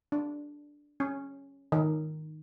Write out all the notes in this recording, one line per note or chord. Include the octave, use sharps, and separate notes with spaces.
D4
C#4
D#3